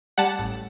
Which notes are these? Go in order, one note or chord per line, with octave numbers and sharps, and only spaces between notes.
G3 F#5 A5
A1